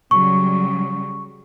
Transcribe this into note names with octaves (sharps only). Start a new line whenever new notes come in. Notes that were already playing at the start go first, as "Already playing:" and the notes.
C#3 F#3 G3 C#6